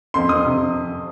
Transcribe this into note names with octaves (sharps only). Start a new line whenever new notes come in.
F2 C6
F2 D#6
C3